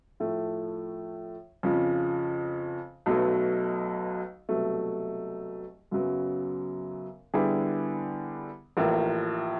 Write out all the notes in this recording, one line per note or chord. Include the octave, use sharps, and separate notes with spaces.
A2 F3 A3
F2 C#3 F3
B1 B2 F#3 A3
C2 B2 F#3 A3
F#2 C#3 F#3 B3
D3 G3 B3 E4 G#4
A1 A2 F3 A#3